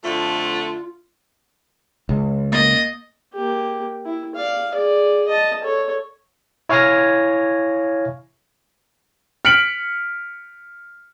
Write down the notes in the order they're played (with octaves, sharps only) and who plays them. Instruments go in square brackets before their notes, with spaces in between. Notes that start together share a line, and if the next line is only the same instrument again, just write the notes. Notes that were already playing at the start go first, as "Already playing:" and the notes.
[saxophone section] F2 D3 A3 [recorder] F4
[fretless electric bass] C#2
[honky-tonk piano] A#3 A6 [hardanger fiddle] D#5
[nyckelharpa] A#3 G4
E4
D5 F5
G#4 D5
D#5 A5
A4 C#5
[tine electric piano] E4 C#5 F5 G#5 F6 A#6
[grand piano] F6 B6 C#7 D7 F#7